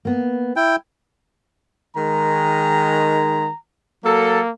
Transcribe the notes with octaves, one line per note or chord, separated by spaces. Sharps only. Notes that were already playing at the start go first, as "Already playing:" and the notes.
A#3 B3
E4 G5
D#3 G#3 A#5
F#3 A#3 A4